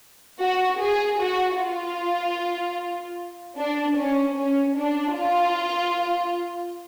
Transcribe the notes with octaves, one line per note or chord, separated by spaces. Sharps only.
F#4
G#4
F#4
F4
D4
C#4
C#4
D4
F4